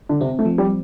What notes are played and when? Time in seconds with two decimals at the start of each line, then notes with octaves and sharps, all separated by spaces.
0.09 D3
0.21 C3 C4
0.39 A3
0.45 F3
0.58 G3